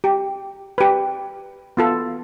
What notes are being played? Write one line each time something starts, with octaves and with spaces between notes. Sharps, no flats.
G4
G4 B4
B3 F4 A4